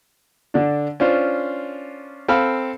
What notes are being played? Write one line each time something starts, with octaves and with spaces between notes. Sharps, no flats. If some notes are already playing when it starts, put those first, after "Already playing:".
D3 D4
C#4 D4 F4 C5
C4 A4 F5 B5